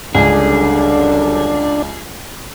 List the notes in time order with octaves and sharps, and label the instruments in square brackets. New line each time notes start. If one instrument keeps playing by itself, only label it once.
[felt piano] C#2 [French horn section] F#2 D3 G3 [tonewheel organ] D4 [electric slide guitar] G#4